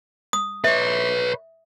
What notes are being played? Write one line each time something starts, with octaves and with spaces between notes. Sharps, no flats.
D#6
B4 C#5 E5